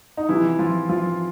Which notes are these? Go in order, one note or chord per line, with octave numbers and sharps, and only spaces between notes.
D#4
C3 E3 F3 E4
F3 F4
F3 F4